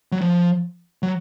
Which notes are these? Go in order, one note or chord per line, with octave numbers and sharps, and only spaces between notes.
F#3
F3
F#3